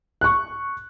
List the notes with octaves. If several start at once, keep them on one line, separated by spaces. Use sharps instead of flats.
C#6 F#6